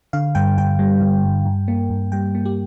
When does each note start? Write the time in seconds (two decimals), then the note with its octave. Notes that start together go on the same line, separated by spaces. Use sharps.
0.13 D3 F5
0.35 G2 G5
0.58 G2 G5
0.79 G3
1.01 D3
1.24 G2
1.45 G2
1.68 A#3
1.90 G2
2.12 G3 G5
2.35 A#3
2.45 G4